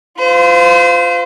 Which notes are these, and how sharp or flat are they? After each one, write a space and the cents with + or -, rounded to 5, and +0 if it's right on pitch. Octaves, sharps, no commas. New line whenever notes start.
F4 +0 C5 -35